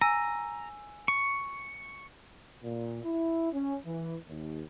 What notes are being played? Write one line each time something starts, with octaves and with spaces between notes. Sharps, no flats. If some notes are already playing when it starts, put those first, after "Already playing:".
G#5 A#5 E6 D#7
C#6
A#2
E4
C#4
E3
D#2